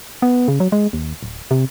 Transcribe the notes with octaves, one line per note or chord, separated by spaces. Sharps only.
B3
C#3
F#3
G#3
D#2
D1
C3